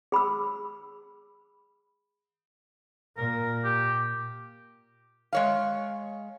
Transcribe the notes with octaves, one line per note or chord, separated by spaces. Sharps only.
G#4 B5 D6 E6
A#2 A#4
G4
G#3 C#5 F5